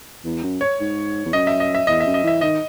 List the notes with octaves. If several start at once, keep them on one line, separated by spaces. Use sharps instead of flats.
E2
F#2
C#5
G#2
E2
F#2 D#5
E5
D#5
E5
E2 D#5
E5
F#2
D#5
E3 E5
D#3 D#5